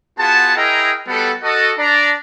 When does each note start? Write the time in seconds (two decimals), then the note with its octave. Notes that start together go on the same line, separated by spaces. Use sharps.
0.19 B3 F4 F#4 G#4 A5
0.56 E4 G#4 A#4 D#5 G5 A#5
1.08 G3 B3 F#4 A4
1.43 F#4 A4 D#5
1.78 D4 D5 A#5